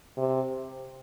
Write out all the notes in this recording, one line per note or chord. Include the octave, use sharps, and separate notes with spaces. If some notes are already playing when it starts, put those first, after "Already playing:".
C3